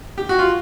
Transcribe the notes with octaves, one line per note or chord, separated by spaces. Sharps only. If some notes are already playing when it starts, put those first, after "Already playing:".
G4
F#4
F4